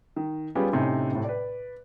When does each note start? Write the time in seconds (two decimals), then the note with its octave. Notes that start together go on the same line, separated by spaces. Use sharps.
0.16 D#3
0.55 G3 B3 C#4 F4 G#4 G5
0.72 A2 C3 C#4 D#4
1.12 A2 C3
1.24 B4 D5